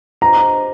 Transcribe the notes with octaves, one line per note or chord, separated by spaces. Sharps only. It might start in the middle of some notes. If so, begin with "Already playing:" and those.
D4 G4 C5 D#5 A#5